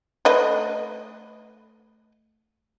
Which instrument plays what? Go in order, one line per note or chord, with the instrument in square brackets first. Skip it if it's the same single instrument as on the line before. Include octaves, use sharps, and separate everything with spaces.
[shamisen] A3 B4 D#5